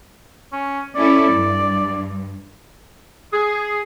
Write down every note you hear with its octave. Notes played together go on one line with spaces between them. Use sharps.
C#4
C#4 E4 A4 D5
G2
G#4